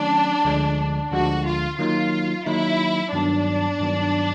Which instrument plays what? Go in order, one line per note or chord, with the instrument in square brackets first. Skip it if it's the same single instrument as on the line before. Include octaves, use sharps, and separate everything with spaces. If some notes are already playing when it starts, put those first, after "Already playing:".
Already playing: [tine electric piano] D#3 F#3 A3 C#4 [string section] D4
[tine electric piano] D2 D3 F3 G#3
[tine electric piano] D2 D3 F3 G#3 [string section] F#4
[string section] F4
[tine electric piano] D#3 F#3 A#3 D#4 [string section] F4
[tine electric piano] D#3 F#3 A#3 D#4 [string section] E4
[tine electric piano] G2 D#3 F#3 B3 [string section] D4
[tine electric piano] G2 D#3 F#3 B3